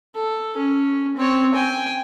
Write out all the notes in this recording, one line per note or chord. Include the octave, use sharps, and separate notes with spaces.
A4
C#4
C4 C#5
G5 G#5